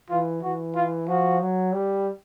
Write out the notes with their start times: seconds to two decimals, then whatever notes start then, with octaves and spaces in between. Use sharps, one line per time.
0.10 E3 F4
0.42 E3 F#4
0.75 F4
1.07 F3 F#4
1.40 F#3
1.72 G3